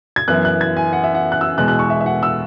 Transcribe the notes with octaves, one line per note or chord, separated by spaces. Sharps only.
G#6
F#2 E3 B3 E4 F#6
F#6
G#6
G#5
F#5
E5
F#5
F#6
E6
E2 B2 G#3 F#6
F#6
C#6
E5
E5
F#5
E6